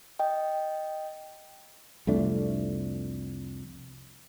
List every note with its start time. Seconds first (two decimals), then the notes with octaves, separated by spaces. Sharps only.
0.19 D#5 G5
2.07 C2 F2 A3 D4